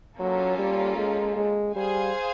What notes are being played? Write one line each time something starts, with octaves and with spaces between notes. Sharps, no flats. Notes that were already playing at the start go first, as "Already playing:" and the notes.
F#3 A#3 C#4 F4 A4
G3
G#3
G#3
G3 G#4 C5 F5 G#5